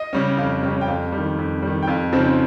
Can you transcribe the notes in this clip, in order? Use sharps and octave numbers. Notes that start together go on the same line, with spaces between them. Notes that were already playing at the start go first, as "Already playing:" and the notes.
Already playing: D#5
C#3 G3 C#4
F2 F5
C#3 G3 C#4
G5
F2 F5
G3
D#3
F2
G3
D#3
G5
F2 F5
C#3 F3 C4 D#4